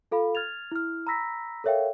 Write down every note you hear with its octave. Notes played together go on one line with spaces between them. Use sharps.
F4 A4 F5 B5
F6 G#6 A6 F7
E4 F6
A#5 B5 E6 A#6 B6
A4 A#4 C#5 E5 F5 G5